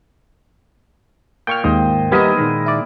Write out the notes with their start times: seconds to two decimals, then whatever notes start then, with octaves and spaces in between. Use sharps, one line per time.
1.47 A#2 G5 C#6 F6
1.64 D#2 G#2 C5 D#5 G5
2.12 D#2 G3 B3 D#4 E4 G4 A#4 D#5
2.38 A#2 D#3 G#3
2.66 E4 D5